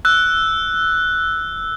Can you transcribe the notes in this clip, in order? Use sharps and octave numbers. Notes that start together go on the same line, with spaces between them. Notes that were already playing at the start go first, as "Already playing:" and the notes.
E6 F#6